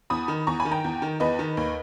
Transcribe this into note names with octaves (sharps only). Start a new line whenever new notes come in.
E2 B5 D#6
D#3
E2 A#5 C#6
G#5 B5
D#3
G5 A#5
E2
D#3
E2 B4 D#5
D#3
D#2